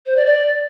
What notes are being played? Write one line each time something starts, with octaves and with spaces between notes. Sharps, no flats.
C5
D5
D5